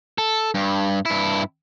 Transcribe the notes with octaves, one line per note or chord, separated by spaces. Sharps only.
A4
G2
G2 E4